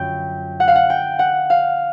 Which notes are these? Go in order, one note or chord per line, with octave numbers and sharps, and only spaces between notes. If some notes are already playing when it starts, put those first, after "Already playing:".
Already playing: F#2 D3 F3 G5
F#5
F5
F#5
G5
F#5
F5